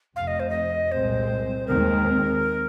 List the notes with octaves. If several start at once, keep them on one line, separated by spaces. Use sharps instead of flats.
F1 F2 C3 F5
D#5
C5
D#5
C2 A#2 G#3 C4 C5
D#2 D#3 G#3 C4 A#4